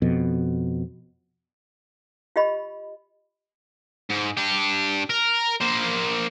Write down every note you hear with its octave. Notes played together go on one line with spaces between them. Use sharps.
F2 B2
F4 G4 D#5 B5
G#2
D4 G4
A#4
A#3 C5